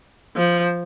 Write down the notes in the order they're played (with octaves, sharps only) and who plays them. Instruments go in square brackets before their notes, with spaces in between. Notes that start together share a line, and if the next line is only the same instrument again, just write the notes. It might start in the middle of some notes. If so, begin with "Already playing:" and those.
[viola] F3